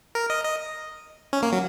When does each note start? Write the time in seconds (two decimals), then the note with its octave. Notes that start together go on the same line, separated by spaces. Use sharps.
0.15 A#4
0.30 D#5
0.45 D#5
1.33 C#4
1.42 A#3
1.52 F#3